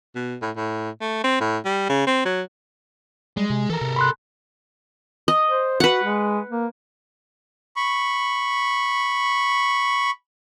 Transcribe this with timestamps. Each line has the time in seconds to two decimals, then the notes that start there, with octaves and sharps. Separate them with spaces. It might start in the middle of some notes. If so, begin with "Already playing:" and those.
0.15 B2
0.42 A2
0.57 A2
1.01 A3
1.24 C4
1.41 A2
1.65 G3
1.89 C#3
2.07 C4
2.25 F#3
3.37 G3 G#3
3.50 C3
3.70 E3 A4 A#4
3.81 C3
3.96 B5 C6 F#6
5.28 D#5
5.47 C5
5.80 F#4 B4 F#5
6.04 G#3
6.49 A#3
7.76 B5 C#6